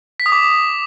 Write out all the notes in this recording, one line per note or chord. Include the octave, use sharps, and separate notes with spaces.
B6
D#6
D6